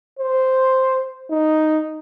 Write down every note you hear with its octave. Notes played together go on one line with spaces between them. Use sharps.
C5
D#4